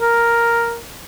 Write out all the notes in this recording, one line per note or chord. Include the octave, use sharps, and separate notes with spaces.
A#4